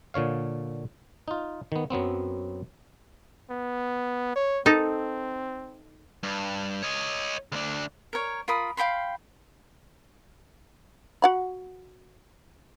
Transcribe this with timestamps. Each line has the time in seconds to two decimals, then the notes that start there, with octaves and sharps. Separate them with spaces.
0.14 A#2 D3 C#5 F5
1.28 D#4 F4
1.72 D#3 B3
1.90 F#2 F#3 B3 C4
3.50 B3
4.36 C#5
4.66 C4 D#4 A4
6.23 G2
6.83 C#5 D#5
7.52 D2 D4
8.13 A#4 C#5
8.48 F4 A#4 B5 D#6
8.77 F5 G5 B5 C6
11.22 F#4 F#5 B5